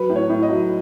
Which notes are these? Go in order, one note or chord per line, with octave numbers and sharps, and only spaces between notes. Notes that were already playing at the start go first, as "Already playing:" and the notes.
Already playing: F#3 B4
A2
C#5
A2
D#5
F#3